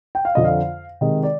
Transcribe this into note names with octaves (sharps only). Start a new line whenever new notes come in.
G5
F5
F2 D3 F3 D#5
F5
C3 D#3 G#3 D#5
D5